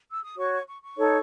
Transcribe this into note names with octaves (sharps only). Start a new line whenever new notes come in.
E6
D#6
F#4 C#5 C#6
C#6
C#6
C#6
D#4 A4 C#5